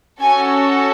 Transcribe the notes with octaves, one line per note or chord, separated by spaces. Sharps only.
C#4 F#4 A4 G#5